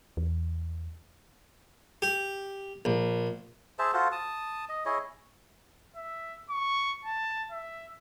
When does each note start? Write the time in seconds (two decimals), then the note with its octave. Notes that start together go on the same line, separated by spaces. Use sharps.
0.17 E2
2.02 G4
2.85 A#1
3.79 G#4 C5 E5 A5
3.93 F4 F#4 A4 C5
4.12 A5 D#6
4.69 D#5
4.85 E4 G#4 C#5 D#5
5.96 E5
6.50 C#6
7.05 A5
7.51 E5